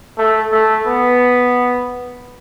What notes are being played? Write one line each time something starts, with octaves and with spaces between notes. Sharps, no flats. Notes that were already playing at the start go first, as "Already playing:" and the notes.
A3
A3
B3